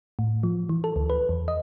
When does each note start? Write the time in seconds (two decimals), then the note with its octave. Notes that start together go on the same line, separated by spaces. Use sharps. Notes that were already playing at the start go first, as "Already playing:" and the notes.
0.19 A2
0.43 F3
0.69 E3
0.84 A4
0.96 D2
1.10 B4
1.29 E2
1.48 D#5